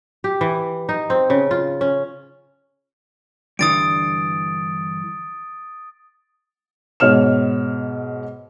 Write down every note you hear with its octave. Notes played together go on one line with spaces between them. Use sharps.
G4
E3
D#4
C4
C#3
F4
C#4
G2 D3 E3 D#6 A6 D7
G#2 B2 C#5 F6 E7